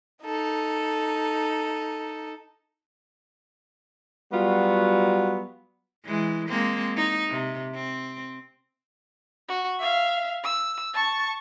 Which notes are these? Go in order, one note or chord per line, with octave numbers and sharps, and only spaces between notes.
D#4 A4
F#3 G3 B3 F4 F#4
E3 G#3
G#3 A#3 C4
D#4
C3
C4
F#4
E5 F5
E6
A5 C#6